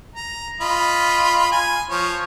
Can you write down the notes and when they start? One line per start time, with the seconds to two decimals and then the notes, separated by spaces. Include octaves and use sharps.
0.16 A#5
0.61 F4 D#5 B5
1.52 G#5
1.90 F3 C#5